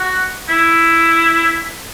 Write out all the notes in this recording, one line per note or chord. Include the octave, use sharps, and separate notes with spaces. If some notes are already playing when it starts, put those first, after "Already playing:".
Already playing: F#4
E4